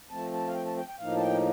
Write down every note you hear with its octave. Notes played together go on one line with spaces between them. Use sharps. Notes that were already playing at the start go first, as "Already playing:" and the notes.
F3 A3 C4 A5
A5
F5
G5
A5
G5
G5
A2 F3 A#3 D#4 F5
A5
G5